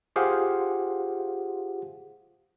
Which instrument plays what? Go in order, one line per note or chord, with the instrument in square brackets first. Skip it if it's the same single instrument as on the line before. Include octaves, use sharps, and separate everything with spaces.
[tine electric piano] F4 G4 G#4 C5 F5 F#5